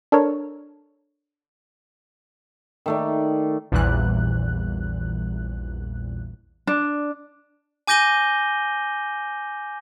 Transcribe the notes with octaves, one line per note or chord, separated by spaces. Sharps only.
D4 A4 A#4 C#5
D#3 A3 D5
A#1 E2 A#2 E3 G3 F#6
D4
G#5 D6 G6 A#6 D#7 G7